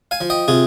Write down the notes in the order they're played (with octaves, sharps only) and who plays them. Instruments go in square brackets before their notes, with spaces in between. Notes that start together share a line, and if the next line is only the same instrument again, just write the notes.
[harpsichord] F5 G#5
F3
D#5 G5
C3 F4 G#4